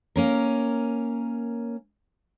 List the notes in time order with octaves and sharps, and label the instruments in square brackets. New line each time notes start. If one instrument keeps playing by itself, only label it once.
[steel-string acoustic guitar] A#3 C#4 A#4